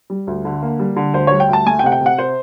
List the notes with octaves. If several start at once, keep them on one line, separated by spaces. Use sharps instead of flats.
G3
D2
D3
A#3
G3
D3
D2 C5
G3 C#5
G5
D2 A5
A3 G#5
G5
C3 F#5
G5
C3
F#5
C5